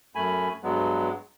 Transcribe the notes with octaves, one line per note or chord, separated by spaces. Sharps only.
F#2 A3 G#5 B5
G2 F#3 G#3 B3